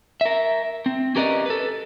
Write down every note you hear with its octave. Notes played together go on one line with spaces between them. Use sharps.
A#4 E5
C4
C#4 G4 A#4 B4 D5 D#5
A4 B4